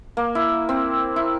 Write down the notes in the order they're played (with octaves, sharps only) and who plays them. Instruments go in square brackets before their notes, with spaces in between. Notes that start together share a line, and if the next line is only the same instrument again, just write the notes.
[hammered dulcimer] A#3
E4
C4
E4